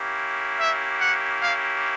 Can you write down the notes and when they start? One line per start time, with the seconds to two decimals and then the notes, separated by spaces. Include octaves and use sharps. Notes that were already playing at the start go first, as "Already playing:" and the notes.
Already playing: A#3 C#4 E4 G4
0.60 E5
1.01 F#5
1.42 F5